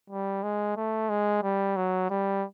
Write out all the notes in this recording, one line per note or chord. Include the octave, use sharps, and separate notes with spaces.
G3
G#3
A3
G#3
G3
F#3
G3